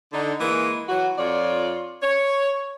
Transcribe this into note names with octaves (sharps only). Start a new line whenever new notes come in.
D3 D#4
E3 G#3 A#3
E3 F#3 F#4
F2 F4 C#5 D5
C#5